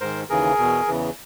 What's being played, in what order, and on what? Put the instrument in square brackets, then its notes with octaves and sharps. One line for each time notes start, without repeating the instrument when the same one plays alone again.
[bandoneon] G#2 D#3 A#4 C5
D#2 C#3 E3 G#4 A#4
E2 B2
E2 C#3 E3